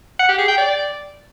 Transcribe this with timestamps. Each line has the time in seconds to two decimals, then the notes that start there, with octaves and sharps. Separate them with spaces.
0.19 F#5
0.29 G4
0.39 G#4
0.48 G5
0.58 D5